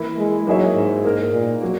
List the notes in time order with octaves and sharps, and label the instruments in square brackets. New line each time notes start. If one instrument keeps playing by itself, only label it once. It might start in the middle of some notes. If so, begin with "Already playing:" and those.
Already playing: [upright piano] E3 A#3 E4
[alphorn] G#3
[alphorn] F#3 [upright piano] A#3 D#4 G#4 C#5 E5
[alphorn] G#2
[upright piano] A#3 D#4 A#4
[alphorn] A#2
[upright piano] F#3 A#3